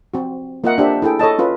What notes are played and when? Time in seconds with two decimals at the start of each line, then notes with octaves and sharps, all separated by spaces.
0.14 C4 F#4
0.64 A#3 F4 A#4 D#5 E5 F#5
0.78 D4 G4 C5 E5
1.02 E4 G#4 A4 G5
1.19 A4 C#5 D#5 A5
1.38 C#4 F4 B4